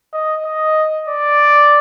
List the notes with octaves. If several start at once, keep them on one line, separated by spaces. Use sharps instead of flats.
D#5
D#5
D5